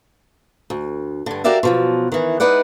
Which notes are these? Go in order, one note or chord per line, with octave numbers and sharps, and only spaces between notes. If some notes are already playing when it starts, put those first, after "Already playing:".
D2
G2 D3
F#4 G4 A#4 D5 E5 F5
B2 F3 F#3
D#3 E3
G#3 D#4 B4 D5 F#5